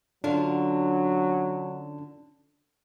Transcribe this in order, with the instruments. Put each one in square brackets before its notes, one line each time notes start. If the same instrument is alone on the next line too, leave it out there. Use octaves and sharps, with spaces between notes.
[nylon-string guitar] D3 C#4 F4 [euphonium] F#3 [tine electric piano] D4